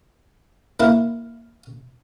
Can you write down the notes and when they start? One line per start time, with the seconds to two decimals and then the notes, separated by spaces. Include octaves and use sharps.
0.80 A#3 E4 A#4